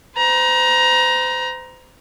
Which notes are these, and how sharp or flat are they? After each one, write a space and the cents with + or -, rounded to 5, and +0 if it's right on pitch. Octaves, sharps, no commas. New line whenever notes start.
C5 -35 A#5 +20